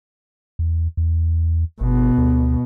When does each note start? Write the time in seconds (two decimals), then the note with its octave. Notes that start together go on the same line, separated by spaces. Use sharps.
0.59 E2
0.97 E2
1.81 G1 B2
2.18 D2